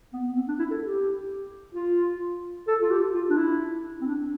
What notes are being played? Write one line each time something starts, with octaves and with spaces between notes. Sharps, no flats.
B3
B3
C4
D4
E4
A4
G4
F4
A4
F4
G4
F4
D4
E4
C4
D4